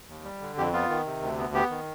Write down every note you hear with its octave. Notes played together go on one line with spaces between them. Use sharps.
D#2
G3
D3
F2 G4
B3 F4
D#3
C3
D2
B3
B3 G4
D#3